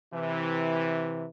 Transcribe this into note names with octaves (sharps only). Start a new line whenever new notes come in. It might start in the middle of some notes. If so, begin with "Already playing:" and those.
C3 E3